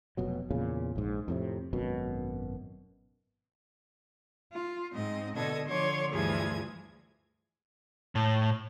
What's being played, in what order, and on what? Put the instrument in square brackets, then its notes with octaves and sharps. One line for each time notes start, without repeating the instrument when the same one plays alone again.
[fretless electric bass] F1 B2 F#3
E2 A#2 C#3
A#1 G#2
F2 A2 C3
G#1 F#2 B2
[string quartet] F4
G#2 C4 D#5
B2 D3 D4 A4 D#5 G#6
D3 F3 C#5 C6 D6 G#6
D2 G2 E3 F3 G#4 G#6
[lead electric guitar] A2